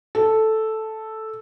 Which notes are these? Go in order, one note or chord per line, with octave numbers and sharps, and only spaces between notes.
A4